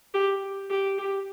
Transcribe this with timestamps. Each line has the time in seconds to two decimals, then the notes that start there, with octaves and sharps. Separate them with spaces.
0.14 G4
0.70 G4
0.98 G4